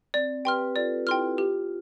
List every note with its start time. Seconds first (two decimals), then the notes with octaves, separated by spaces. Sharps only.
0.14 C4 D5
0.45 G4 B4 G5 C6 F6
0.76 F4 A4 D5
1.07 E4 G4 G5 C6 F6
1.37 F4 G4